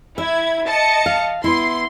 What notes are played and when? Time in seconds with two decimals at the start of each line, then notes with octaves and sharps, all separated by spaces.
0.18 E4 E5 G#6
0.67 D#5 A5 C#7
1.06 F5
1.44 B3 E4 C6